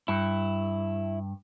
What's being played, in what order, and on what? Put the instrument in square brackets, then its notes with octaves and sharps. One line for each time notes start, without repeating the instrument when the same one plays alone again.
[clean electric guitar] G2 [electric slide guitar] E4